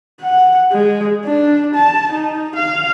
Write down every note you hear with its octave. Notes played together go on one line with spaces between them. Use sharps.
F#5
G#3
D4
A5
D#4
F5